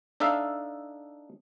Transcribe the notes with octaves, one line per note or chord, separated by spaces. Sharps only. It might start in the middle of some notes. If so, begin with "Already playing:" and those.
D4 D#4 A4 E5 F5